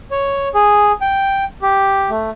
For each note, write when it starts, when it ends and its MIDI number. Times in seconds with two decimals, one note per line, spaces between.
0.11 0.48 73
0.55 0.92 68
1.01 1.44 79
1.62 2.10 67
2.10 2.30 57